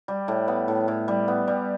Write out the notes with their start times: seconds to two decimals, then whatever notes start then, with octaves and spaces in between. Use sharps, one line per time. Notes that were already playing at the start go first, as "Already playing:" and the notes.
0.08 G3
0.28 A2
0.48 B3
0.68 A2
0.88 A2
1.08 G3
1.28 B3
1.48 G3